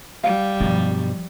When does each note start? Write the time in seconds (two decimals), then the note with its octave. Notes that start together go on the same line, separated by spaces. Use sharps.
0.24 G3 F5
0.61 B1 G2 B2 F3